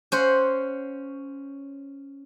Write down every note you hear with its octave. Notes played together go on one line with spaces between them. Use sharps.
C#4 C5 F#5